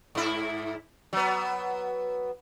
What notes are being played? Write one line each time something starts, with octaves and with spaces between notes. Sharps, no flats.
G#2 E4
F#3 B3